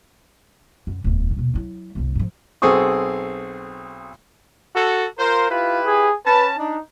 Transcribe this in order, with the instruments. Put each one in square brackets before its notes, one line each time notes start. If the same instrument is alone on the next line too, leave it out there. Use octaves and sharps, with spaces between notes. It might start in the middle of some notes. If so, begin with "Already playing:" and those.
[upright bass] F#2
D1 E2
D#2 B2
F#3 E4
F#1 C2
G#2 F3
[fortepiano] B1 C4 G#4 A4 C#6 D#6
[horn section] F#4 A4
[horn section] F4 C5 [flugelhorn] A#4
[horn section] E4 G4 B4 [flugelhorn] F4
[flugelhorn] G#4
[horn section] C#4 A5 [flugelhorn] B4
[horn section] D4 [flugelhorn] D#4